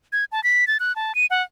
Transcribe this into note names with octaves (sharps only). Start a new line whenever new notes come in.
G#6
A5
B6
A6
F#6
A5
D#7
F#5